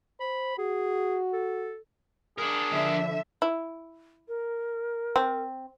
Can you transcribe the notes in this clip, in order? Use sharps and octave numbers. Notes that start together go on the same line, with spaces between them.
C5 B5
F#4 G#4
A4
D4 G#4 A#4
D3 F3 E5
E4
A#4
C4